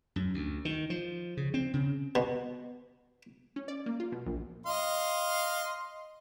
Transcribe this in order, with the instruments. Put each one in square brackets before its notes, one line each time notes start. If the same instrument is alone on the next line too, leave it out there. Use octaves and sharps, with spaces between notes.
[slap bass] F#2
D2
D#3
F3
C#3
C4
C#3
[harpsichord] B2
[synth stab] C#4
D5
A#3
F4
B2
A#1
[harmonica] D#5 F5 C6